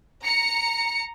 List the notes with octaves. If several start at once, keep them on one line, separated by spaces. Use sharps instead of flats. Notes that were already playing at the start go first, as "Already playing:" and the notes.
A#5 C#7